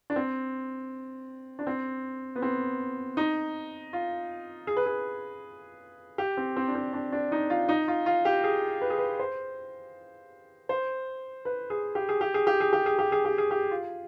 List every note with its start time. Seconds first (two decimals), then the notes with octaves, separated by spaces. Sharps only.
0.10 D4
0.16 C4
1.59 D4
1.67 C4
2.36 B3
2.42 C4
3.17 D#4
3.93 F4
4.67 G#4
4.77 B4
4.86 G#4
6.18 G4
6.37 C4
6.56 C4
6.68 D4
6.75 C4
6.93 D4
7.12 D4
7.32 D#4
7.50 F4
7.69 D#4
7.88 F4
8.06 F4
8.25 G4
8.44 G#4
8.81 B4
8.90 G#4
8.99 B4
9.19 C5
10.69 C5
11.45 B4
11.70 G#4
11.95 G4
12.09 G#4
12.21 G4
12.34 G#4
12.47 G4
12.60 G#4
12.73 G4
12.86 G#4
12.99 G4
13.12 G#4
13.25 G4
13.38 G#4
13.51 G4
13.71 F4